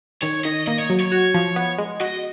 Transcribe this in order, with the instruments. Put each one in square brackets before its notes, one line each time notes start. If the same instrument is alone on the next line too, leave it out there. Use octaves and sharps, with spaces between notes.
[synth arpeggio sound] D#3 [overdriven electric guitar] C#5
[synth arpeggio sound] D#3 [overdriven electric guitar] D#5
[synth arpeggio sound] A#3 [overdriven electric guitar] D#5
[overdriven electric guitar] C#5
[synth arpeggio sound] F#3
[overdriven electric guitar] C#5
[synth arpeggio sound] F#4
F3
B3
G#3
[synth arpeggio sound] F#4 [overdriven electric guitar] D#5